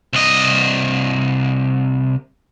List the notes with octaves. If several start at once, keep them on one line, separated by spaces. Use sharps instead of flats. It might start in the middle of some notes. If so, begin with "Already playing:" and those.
C2 D#5